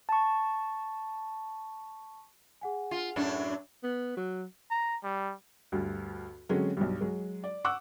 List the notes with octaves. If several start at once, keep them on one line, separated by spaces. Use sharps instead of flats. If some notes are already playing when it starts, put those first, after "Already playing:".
A5 C#6
G#4 F#5 G#5
F4
F#2 A2 D4
B3
F#3
A#5
G3
D2 G2
D3 F#3 G#3 C4 C#4
B1 G2
F#3 G#3
D5
F#5 C#6 D6 E6 F#6